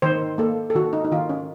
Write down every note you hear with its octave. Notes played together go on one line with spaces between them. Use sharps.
D#3 C5
A#3 A4
A4
D#3 F#4
D#4
D#4
D#3 F4
C#4